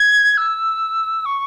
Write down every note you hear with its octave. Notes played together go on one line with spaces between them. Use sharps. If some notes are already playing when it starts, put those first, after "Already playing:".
Already playing: G#6
E6
C#6